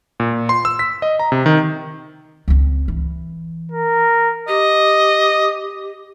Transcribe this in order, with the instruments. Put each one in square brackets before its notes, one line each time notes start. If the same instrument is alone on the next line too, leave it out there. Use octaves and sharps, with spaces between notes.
[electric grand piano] A#2
C6
E6
B6
D#5
A#5
C3
D#3
[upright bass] C#2 C4
E3
[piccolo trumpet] A#4
[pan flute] G4 [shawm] D#5